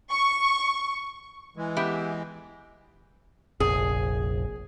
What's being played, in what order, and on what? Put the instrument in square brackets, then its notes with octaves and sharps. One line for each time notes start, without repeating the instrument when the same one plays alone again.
[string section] C#6
[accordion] E3 G#3
[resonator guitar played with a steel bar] B3 G4 E5
[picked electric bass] F1 A#1 [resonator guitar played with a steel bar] G#4